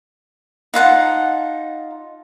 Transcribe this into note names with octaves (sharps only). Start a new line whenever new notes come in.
D#4 F4 F#5 A5